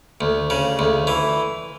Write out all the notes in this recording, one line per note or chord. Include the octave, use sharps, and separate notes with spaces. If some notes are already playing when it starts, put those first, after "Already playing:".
D2
C#3
D2
E3